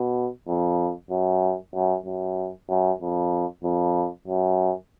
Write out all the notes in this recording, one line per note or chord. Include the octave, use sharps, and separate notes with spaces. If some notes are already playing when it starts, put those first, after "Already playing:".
Already playing: B2
F2
F#2
F#2
F#2
F#2
F2
F2
F#2